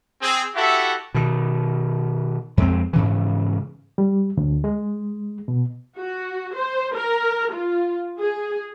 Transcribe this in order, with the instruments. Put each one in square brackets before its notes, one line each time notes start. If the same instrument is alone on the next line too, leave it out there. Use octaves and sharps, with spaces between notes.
[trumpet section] C4 G#4
E4 F#4 G4 A4 E5 F#5
[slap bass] B2 D#3
F2 G#3 B3 C4
G#2 C#3 E3
[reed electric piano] G3
D2
G#3
B2
[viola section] F#4
C5
A#4
F4
G#4